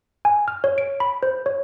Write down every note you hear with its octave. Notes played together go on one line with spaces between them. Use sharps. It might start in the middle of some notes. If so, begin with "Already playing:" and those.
G#5
F6
C#5
D7
B5
C5
C#5